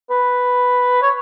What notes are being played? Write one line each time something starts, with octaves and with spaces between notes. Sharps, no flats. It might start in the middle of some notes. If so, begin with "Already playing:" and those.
B4
C#5